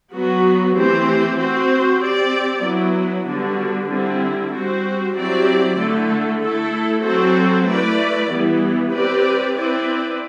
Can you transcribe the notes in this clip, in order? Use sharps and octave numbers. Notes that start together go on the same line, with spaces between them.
F#3 B3 F#4
E3 A3 C4 G4 C5
C4 F#4 C5
C4 G4 D5
F#3 B3 E4
D3 G3 B3 D4 F#4
D3 G3 C4 E4
G3 C4 F#4 C5
F#3 C4 E4 G4 D5
D3 A3 E4 A4
A3 E4 A4
F#3 C4 F#4 A4 C5
A3 E4 B4 D5
E3 G3 B3 E4
C4 G4 B4 D5
C4 E4 B4 D5